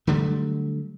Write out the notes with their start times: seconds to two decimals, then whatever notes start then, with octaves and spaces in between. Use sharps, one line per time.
0.07 D3 F#3 G3 A3